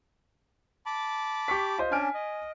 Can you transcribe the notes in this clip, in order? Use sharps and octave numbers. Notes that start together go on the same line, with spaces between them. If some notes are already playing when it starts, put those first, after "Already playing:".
A5 B5 D6
G4 C#6 B6
F4 C5 D#5
C#4 D4 G#5 F6 D7
D#5